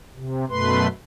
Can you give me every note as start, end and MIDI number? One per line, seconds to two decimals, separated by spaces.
0.15 0.45 48
0.50 0.87 42
0.50 0.87 47
0.50 0.87 57
0.50 0.87 71
0.50 0.87 84